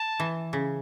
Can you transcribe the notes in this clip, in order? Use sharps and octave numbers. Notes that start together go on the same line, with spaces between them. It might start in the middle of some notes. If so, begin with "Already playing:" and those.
Already playing: A5
E3
C#3